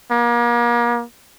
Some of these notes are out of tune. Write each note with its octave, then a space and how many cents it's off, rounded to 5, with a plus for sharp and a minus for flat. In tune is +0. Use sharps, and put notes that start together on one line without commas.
A#3 +35